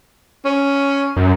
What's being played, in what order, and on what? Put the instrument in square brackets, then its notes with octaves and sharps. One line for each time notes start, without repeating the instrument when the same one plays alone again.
[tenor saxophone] C#4
[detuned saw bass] F#2